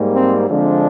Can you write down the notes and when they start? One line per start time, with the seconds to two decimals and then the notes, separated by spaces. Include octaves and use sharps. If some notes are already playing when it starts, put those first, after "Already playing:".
Already playing: G#2 G3 A#3
0.13 C4
0.48 D3 F3 G#3 C4 D4